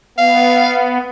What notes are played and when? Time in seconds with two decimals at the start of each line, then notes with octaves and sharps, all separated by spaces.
0.18 B3 F5